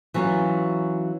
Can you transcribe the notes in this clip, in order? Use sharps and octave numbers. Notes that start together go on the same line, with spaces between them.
E3 F#3 B3 C#4 F4 F#4